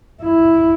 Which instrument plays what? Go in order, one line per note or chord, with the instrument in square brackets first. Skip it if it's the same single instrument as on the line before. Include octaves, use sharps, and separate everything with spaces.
[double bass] E4